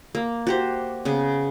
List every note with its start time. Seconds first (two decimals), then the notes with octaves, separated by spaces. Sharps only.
0.15 A#3
0.47 F#4 G4 C5
1.05 C#3 B3 G#5